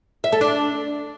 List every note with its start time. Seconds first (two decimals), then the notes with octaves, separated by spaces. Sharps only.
0.24 E5
0.32 A4
0.41 D4